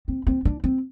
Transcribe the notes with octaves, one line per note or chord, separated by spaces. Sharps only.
C4
C4
D4
C4